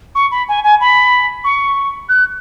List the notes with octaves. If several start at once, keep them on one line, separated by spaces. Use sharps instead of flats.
C#6
B5
G#5
G#5
B5
C#6
F#6